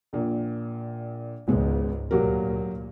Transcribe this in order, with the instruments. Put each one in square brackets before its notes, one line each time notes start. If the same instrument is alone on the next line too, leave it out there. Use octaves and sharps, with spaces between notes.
[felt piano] A#1 A#2
[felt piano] G#1 G#3 B3 [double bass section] C#2 G#2
[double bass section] D2 A#2 [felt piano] F#3 G4 A#4